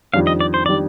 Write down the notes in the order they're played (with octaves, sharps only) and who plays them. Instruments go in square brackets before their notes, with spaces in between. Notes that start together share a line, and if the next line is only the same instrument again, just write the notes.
[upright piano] F2 D#3 G3 D4 [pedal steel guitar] F5
[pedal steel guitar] D#5
D5
C5
[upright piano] D#3 G3 D4 [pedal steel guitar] D5